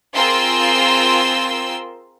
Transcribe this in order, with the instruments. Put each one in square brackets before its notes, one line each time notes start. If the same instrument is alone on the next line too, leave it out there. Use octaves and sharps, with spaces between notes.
[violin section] C4 F4 G#4 A#4 C6 E6